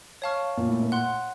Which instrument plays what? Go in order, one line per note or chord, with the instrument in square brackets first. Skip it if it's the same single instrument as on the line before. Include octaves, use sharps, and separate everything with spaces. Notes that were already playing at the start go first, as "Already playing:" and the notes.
[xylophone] C#5 F5 A5 C#6 F6
[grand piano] A#2
A2
A#2
[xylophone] F#5 C6 F#6